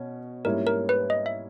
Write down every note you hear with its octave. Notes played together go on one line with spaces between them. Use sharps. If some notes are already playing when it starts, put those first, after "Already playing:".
Already playing: B2 C#4
G#2 G3 A#3 C#4 E4 A#4
A#4
B4
D#5
E5